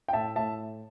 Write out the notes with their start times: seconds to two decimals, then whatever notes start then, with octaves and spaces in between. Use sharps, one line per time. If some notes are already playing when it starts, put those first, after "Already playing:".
0.08 G5
0.13 A2 E5 A5
0.36 A2 E5 A5